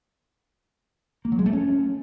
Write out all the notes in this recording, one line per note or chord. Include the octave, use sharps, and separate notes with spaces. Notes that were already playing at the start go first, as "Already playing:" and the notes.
A#3
F#3
G#3
A3
C#4